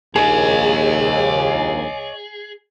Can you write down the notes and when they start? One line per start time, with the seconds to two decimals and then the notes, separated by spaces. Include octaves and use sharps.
0.16 A#1 D#2 G#4 C#5 D#5